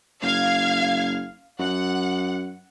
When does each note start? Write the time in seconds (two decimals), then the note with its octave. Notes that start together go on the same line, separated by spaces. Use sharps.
0.23 F#1 F5 G#6
1.59 F#2 F#5